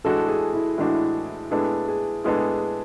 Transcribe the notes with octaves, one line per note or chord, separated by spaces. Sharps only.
A2 E3 G#3 D4 F#4 A4
G#4
E4
A2 E3 G#3 D4 F#4
A2 G#3 B3 D4 G#4 A4
G#4
A2 G#3 B3 D4 G#4 A4